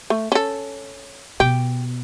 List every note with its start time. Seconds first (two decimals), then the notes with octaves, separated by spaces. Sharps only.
0.10 A3
0.32 C#4 A4
1.40 B2 G4